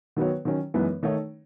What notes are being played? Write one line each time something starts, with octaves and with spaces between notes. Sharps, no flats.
D#3 F#3 B3 F#4 C#5
D#3 F#3 C#4
F#2 E3 G#3 B3 D#4
D#3 A3 D#4 A4 C#5